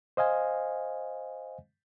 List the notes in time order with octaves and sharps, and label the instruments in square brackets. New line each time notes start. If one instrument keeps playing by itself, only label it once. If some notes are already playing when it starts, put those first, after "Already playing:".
[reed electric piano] C5 D#5 F5 G#5